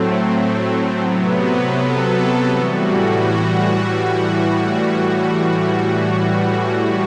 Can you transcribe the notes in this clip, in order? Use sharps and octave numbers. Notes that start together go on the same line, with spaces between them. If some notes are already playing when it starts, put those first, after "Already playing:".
Already playing: A2 F#3 A3 C4
C3 F#3 B3
A4
A2 E3 G3 F#4
F#4